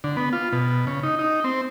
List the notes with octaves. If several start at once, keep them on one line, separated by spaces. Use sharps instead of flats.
D3
B3
F4
B2
C#3
D#4
D#4
C4